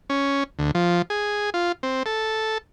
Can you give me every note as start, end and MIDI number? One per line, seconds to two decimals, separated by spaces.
0.10 0.44 61
0.59 0.71 38
0.75 1.02 53
1.10 1.50 68
1.54 1.72 65
1.83 2.03 60
2.06 2.58 69